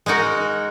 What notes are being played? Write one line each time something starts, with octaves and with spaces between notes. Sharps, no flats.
G#3 D#4 F#4 A#4